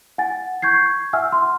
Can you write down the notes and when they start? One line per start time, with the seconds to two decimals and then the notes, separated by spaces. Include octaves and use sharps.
0.18 F#5 G#5 A6
0.62 C#6 G6 G#6 C7
1.13 E5 F#5 G#5 E6 F6
1.32 C6